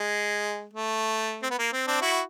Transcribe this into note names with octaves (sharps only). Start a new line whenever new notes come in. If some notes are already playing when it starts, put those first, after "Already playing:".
Already playing: G#3
A3
C4
B3
A#3
C4
C4 D4
E4 F#4